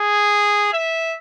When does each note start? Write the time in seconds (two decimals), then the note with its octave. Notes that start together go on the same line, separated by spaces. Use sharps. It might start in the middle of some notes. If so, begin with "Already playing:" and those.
Already playing: G#4
0.73 E5